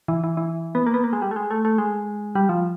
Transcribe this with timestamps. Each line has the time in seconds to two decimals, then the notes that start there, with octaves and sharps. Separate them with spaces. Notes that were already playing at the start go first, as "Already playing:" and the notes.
0.08 E3
0.24 E3
0.37 E3
0.75 B3
0.87 A#3
0.94 B3
1.04 A#3
1.13 G#3
1.22 G3
1.31 A3
1.36 G#3
1.51 A3
1.65 A3
1.78 G#3
2.35 G3
2.49 F3